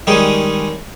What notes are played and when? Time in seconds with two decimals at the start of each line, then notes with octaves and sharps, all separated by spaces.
0.07 D#3 G3 G#3 C#4 G#4